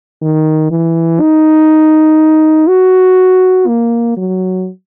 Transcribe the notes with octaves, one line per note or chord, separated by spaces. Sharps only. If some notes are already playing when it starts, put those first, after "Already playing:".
D#3
E3
D#4
F#4
A#3
F#3